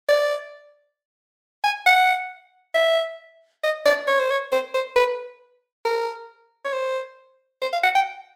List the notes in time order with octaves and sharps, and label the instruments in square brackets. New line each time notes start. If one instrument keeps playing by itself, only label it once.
[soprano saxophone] D5
G#5
F#5
E5
D#5
D5
C#5
C5
C#5
C5
C5
B4
A#4
C#5
C5
C5
F5
F#5
G5